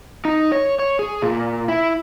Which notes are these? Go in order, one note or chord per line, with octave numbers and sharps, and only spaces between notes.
D#4
C#5
C#5
G#4
A#2
E4